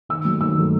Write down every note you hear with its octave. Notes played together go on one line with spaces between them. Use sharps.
D#3 E6
F#3 A3
D#3 E6
F#3 A3